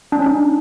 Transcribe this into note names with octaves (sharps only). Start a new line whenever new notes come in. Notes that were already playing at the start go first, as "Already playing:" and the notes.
D4
C#4
D#4